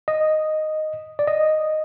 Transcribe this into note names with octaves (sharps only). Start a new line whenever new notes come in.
D#5
D5
D#5